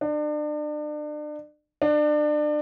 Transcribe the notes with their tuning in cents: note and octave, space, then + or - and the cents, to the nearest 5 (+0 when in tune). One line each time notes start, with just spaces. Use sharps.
D4 +35
D4 +30